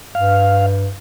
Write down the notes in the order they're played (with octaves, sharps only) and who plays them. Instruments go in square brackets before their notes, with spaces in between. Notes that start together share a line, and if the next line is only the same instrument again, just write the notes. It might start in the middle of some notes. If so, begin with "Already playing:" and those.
[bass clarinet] G2 [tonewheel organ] F5